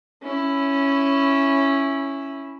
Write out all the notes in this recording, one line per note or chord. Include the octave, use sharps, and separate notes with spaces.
C#4 E4